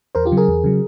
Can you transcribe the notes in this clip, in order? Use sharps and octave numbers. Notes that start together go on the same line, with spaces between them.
E2 A#4 C5
F4 G4
C#3 F#3
G#4 A#4
E2
C#3 F#3